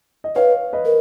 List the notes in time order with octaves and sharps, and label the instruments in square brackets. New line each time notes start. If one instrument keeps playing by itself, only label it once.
[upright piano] D#5
[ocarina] B4 [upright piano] C#5 F5
[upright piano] B4 D#5
[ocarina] A#4